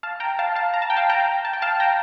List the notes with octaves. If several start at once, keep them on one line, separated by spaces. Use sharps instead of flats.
F5 A5
G5 A#5
F5 A5
F5 A5
A#5
A5
G5
F5 A5
G5 A#5
A5
G5
F5 A5
G5 A#5